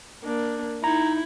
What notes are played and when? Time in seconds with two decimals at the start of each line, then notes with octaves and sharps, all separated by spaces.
0.24 A#3 D4
0.84 D#4 E4 A#5